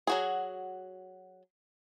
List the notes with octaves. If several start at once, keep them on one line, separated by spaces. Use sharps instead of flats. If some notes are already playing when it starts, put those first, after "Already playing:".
F#3 F#4 G#4